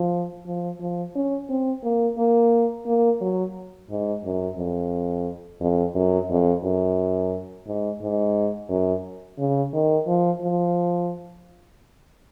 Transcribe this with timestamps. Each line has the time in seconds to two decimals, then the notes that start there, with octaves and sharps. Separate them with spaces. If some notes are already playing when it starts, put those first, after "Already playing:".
Already playing: F3
0.46 F3
0.80 F3
1.15 C#4
1.50 C4
1.84 A#3
2.18 A#3
2.86 A#3
3.21 F#3
3.90 G#2
4.24 F#2
4.57 F2
5.60 F2
5.95 F#2
6.30 F2
6.64 F#2
7.67 G#2
8.02 G#2
8.69 F#2
9.38 C#3
9.73 D#3
10.07 F3
10.42 F3